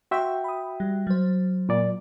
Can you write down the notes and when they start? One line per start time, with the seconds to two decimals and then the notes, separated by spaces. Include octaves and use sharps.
0.11 F#4 E5 F#5 G5 C6
0.44 B5 D#6
0.80 G3
1.07 F#3 C5
1.69 A#2 D5